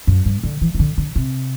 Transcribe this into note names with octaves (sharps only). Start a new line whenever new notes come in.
F#2
G2
D3
E3
E3
D3
D3
C3